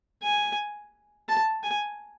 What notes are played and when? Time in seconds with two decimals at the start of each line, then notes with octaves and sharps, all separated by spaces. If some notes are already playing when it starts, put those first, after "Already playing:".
0.23 G#5
1.29 A5
1.63 G#5